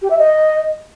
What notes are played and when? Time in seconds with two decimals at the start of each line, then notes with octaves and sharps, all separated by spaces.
0.02 G4
0.10 E5
0.19 D#5